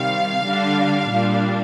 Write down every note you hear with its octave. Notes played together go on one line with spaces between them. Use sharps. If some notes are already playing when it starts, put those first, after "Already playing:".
Already playing: C3 D#3 G3 F5
D3 G3 D4
A#2 G3 D4